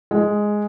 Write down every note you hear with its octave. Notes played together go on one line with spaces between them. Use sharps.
G#3